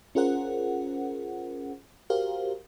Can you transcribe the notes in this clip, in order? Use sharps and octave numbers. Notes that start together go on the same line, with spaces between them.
C#4 F4 G#4 A#4 C5 F#5
F#4 G4 A#4 C5 F5